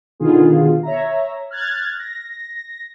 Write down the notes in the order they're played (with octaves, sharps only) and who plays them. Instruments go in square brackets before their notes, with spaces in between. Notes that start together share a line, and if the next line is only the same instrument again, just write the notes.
[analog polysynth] B2 D3 D#3 B3 F4 G#4
C#5 E5 A#5
F6 F#6 G#6 A6
A#6